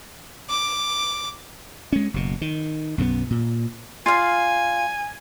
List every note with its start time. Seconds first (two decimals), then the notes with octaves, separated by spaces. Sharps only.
0.50 D6
1.93 G#3 C#4
2.14 F#1 B2
2.41 D#3
2.98 B1 F#2 E3 B3
3.31 A#2
4.06 F4 D5 F5 G#5